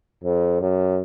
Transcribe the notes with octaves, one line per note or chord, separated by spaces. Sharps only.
F2
F#2